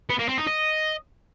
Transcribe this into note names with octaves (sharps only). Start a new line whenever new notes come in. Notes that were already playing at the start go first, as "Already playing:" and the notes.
B3
A#3
C4
D#4
D#5